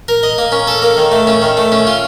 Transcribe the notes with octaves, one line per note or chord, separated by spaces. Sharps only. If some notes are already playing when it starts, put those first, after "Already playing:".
A#4
D#5
A#3
C#4
A4
A#3
D#3
A3
C#4
D#3
A3
C#4
F4